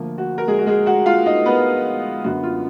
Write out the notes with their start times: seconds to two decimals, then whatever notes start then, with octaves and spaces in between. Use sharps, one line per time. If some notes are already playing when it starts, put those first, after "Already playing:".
Already playing: D2 D3 F3 A#3
0.18 F#4
0.38 A#4
0.48 G#3 G#4
0.59 F#4
0.66 G#3 G#4
0.86 F#4 F#5
1.06 F4 F5
1.26 D#4 D#5
1.45 B3 B4
2.24 F#2 D3 F#3 B3 F#4
2.43 F4